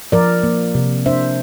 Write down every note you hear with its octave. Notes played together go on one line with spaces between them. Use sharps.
F3 A#4 D5
A#3
C3
D4 C5 E5